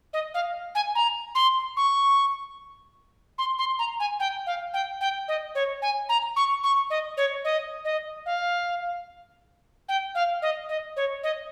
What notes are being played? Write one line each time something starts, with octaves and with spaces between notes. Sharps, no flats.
D#5
F5
G#5
A#5
C6
C#6
C6
C6
A#5
G#5
G5
F5
G5
G5
D#5
C#5
G#5
A#5
C#6
C#6
D#5
C#5
D#5
D#5
F5
G5
F5
D#5
D#5
C#5
D#5